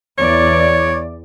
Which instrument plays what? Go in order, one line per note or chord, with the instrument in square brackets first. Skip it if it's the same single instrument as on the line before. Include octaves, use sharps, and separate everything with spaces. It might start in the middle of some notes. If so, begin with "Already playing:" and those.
[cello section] E2 D5 [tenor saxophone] C#5